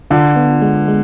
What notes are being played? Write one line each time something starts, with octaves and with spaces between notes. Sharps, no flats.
D3 F4
B3
G#3
G#3